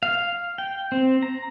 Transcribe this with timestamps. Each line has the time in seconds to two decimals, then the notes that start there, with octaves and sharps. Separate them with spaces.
0.03 F5
0.58 G5
0.92 C4
1.23 A#5